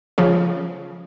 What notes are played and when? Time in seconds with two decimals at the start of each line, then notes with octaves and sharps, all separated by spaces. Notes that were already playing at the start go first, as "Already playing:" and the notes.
0.18 C#3 F3